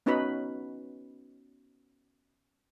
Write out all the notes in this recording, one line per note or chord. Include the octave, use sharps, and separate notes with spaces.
B3 C#4 D#4 F#4 B4 B5